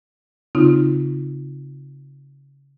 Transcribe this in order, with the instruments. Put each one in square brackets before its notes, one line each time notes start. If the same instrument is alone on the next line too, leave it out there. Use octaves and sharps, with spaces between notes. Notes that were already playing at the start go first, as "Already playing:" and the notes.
[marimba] C#3 C4 D#4 F4